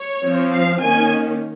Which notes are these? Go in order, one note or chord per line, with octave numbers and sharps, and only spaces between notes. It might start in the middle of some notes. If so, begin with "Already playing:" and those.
Already playing: C#5
F3 C4
F5
D#3 A#3 C#4 G#5